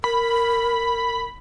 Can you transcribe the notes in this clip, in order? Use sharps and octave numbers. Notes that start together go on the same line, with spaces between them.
A#4 B5